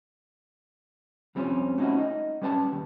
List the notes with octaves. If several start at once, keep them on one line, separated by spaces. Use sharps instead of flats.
F2 G3 C4 C#4 F4
A3 C#4 D#4 E4 F#4
D#4 D#5
G3 C#4 B4 F#5 A5
D#2